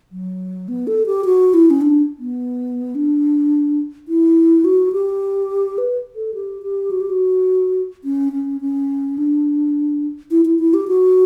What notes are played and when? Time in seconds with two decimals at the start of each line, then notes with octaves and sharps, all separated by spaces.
0.12 F#3
0.68 B3
0.87 A4
1.06 G4
1.25 F#4
1.54 E4
1.70 C#4
1.81 D4
2.19 B3
2.95 D4
4.08 E4
4.64 F#4
4.93 G4
5.78 B4
6.16 A4
6.34 G4
6.63 G4
6.91 F#4
7.01 G4
7.10 F#4
8.04 C#4
8.33 C#4
8.61 C#4
9.18 D4
10.31 E4
10.45 E4
10.59 E4
10.74 G4
10.88 F#4